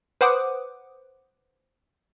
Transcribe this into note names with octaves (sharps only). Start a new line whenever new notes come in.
B4 C5 F#5 D6 D#6